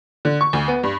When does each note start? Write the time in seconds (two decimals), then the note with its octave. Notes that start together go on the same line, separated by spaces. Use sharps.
0.25 D3
0.41 C#6
0.53 D2
0.68 B3
0.83 G2